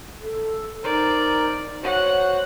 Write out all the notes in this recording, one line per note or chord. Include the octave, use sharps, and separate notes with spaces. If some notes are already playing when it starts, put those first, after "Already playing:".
A4
D#4 A#4 C5 D5
F#4 C5 C#5 F#5